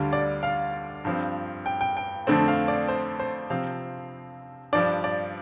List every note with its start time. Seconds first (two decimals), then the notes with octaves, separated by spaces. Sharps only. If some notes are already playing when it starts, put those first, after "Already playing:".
Already playing: D2 D3 G3 D4 F5
0.13 D5
0.43 F5
1.05 G2 F3 C4
1.66 G5
1.81 G5
1.97 G5
2.27 F2 D3 A3 C4
2.48 F5
2.68 D5
2.88 C5
3.20 C5
3.50 C3 F3 C4 F5
4.73 G2 F3 D4 D5
5.04 D5